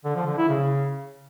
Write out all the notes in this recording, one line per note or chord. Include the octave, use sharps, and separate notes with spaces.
D3
F3
D3
E4
C#3